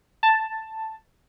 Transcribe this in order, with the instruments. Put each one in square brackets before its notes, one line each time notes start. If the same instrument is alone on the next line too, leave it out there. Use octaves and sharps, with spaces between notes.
[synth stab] A5